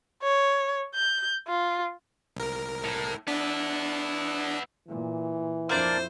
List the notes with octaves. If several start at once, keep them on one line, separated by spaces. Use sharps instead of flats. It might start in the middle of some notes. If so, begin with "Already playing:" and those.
C#5
G6
F4
C2 A#4
A2
B3 D4 E4
A#2 E3
F2 A#3 D4 E4 C5